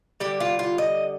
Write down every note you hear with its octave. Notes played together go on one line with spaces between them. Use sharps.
D3 G3 G4
F4
F4
D#5